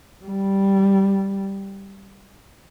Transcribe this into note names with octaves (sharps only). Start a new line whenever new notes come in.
G3